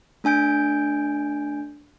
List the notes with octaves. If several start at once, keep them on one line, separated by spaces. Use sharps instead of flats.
A3 D4 G#5 G6 D7